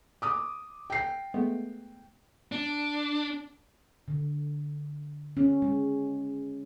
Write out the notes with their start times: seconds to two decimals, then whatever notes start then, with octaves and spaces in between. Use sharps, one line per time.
0.22 D6 D#6
0.90 G5 C7
1.34 G#3 A3 B3
2.52 D4
4.08 D3
5.37 C#4
5.62 G#3